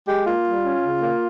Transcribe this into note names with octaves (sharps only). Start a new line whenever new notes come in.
G#3 G4
A#3 F4
G3
C#4
C#3
A#3